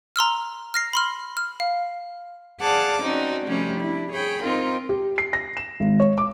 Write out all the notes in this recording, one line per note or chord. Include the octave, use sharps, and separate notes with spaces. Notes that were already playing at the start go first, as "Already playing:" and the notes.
A#5 C6 E6 F6
F6 A#6 C7
B5 C6 F6
F6
F5
G#4 D5 F5 F#5 A5 D6
C4 C#4 D#4 F#4 D5
C3 F3 G3 A3 C#4
D4 E4
G#4 C#5 G5 B5
C4 D#4 F4 A#4
G4
C7
A#6
E7
G#1
C#5
D6